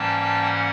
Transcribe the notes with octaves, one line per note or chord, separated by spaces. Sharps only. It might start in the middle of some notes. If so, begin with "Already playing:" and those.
Already playing: G#2 E3 G3 A#3 C#4 G5 A5
F#5